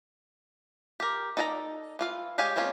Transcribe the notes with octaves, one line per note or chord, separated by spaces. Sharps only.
G4 A#4
D#4 A4 D5 G#5 A#5
E3 F4 F5
G#3 G4 C#5 F5 G#5
G#3 A#3 C4 C#4 F4